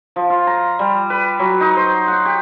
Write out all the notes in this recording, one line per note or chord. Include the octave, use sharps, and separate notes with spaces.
F3
F4
A#5
G3
B4
F#3
D#4
C5
F#5
G4